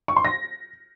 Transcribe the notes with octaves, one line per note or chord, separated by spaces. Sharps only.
C#6
C6
A#6